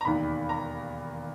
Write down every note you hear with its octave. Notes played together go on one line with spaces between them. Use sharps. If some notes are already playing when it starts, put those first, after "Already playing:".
A#5
E1 D#2 D#3 B5
A#5